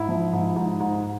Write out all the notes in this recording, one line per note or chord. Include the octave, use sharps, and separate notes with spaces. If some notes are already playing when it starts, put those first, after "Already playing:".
Already playing: G#2 E4
F3
G#2
G#2
G#2